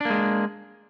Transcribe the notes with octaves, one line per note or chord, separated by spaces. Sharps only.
G#3 A#3 D4